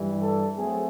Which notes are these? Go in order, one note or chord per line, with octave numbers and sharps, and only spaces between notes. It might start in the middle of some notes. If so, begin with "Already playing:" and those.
Already playing: G2 E3 G3
A4
F#3 A3 C4 G#4